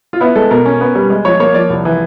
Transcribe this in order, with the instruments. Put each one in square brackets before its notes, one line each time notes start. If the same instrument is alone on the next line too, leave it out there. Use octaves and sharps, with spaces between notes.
[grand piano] F4
B3 E4
G#3 A4
B2 A#4
C#4
B3
G3
G#3
F3 C#5
A#3 C#5
F3 D5
C2
E3